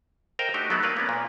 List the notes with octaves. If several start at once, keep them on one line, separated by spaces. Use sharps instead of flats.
A#4 C5 D#5 F5 G5
A3 D4 D#4 F#4 G4
F#3 A3 B3 D#4 F#4
A3 A#3 A#4 B4 D5 F5
A#3 B3 C#4
A#2